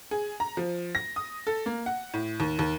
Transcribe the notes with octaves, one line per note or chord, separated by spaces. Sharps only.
G#4
A#5
F3
A#6
D#6
A4
A#3
F#5
A2
D#2
D#2